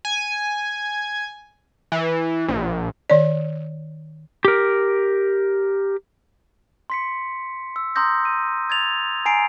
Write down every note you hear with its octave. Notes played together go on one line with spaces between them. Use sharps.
G#5
E3
A#1
D#3 C#5 D5
G4 A#4
C6 B6 C#7
E6
A#5 C6 D#6 E6 G6 A#6
D#7
G#6 A6 F7
G#5 A#5 C7 D7